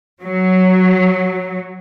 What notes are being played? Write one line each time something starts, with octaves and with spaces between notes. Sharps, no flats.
F#3